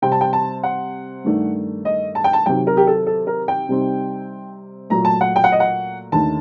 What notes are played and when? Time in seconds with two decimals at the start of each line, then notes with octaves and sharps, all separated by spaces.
0.02 C3 G3 C4 G5
0.12 A5
0.21 G5
0.33 A5
0.63 F#5
1.24 G2 D#3 A3 D4
1.85 D#5
2.15 A5
2.24 G5
2.33 A5
2.46 C3 D#3 F#3 G5
2.67 A#4
2.77 G4
2.87 A4
3.07 A4
3.27 A#4
3.48 G5
3.69 C3 G3 C4 D#4
4.90 A#2 F#3 A3 A#5
5.05 A5
5.21 F#5
5.36 G5
5.44 F#5
5.52 D#5
5.60 F#5
6.12 D#2 D3 A3 D#4 A5